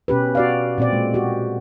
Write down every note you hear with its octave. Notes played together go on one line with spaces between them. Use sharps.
B2 C#4 G4 B4
F#4 D5 F5
A#2 C4 D5
G#3
F#4 G4